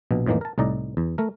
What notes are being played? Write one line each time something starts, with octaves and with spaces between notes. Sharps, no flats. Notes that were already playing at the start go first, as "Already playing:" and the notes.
A#1 B2
F2 A2 D#3 E3 A#3
A#4 A5
C2 A2 D#4 D5 A#5
E2
A3 A#4